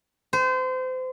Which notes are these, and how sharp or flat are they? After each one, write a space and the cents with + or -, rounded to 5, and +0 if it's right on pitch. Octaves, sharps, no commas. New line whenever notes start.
C5 -30